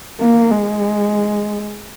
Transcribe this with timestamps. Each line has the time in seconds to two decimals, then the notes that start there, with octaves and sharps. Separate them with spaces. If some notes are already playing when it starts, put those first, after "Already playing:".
0.21 A#3
0.51 G#3